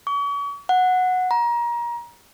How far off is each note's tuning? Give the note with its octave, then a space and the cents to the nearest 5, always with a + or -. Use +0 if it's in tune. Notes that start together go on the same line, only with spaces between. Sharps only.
C#6 +40
F#5 -10
A#5 +25